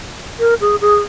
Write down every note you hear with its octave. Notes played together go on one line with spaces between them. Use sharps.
A#4
G#4
G#4